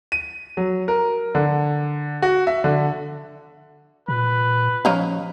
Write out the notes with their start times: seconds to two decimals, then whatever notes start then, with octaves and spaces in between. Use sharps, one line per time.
0.12 D#7
0.57 F#3
0.88 A#4
1.35 D3
2.22 F#4
2.47 E5
2.64 D3
4.08 A#2 B4
4.85 F3 C#4 D#4 F5